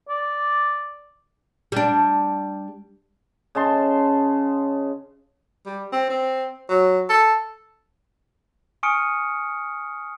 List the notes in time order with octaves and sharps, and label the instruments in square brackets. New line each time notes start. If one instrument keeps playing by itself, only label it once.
[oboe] D5
[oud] G3 D4
[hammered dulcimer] C#3 D#5 A5 C6
[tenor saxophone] G3
C4
C4
F#3
A4
[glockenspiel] G#5 C#6 D#6 F6 C#7 D7